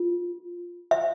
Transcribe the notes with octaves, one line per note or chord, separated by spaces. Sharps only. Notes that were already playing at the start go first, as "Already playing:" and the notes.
Already playing: F4
E5